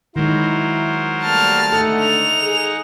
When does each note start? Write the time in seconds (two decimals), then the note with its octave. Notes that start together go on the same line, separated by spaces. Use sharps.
0.16 D#3 F#3 G#3 E4 A#4 C5
1.25 G3 A3 A#3 A5 F6
1.72 D3 A3 D#4 A4 F#5
2.01 F7
2.43 G#4